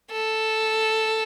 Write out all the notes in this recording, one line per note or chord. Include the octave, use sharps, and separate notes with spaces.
A4